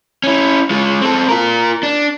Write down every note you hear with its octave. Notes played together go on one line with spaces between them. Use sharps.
C#4 E4
G#3 F4
C4 A4
F4 A#4
D4